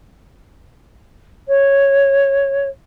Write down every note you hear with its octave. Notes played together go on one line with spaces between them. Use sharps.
C#5